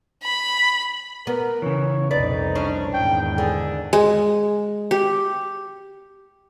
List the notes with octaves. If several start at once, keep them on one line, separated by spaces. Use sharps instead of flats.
B5
B3 A#4
C#3 E3 C#5
C2 F2 A#2 D#4 B4 D5
C#4 D4
E2 G#2 D#3 G5
D3 G#4
G#3
G4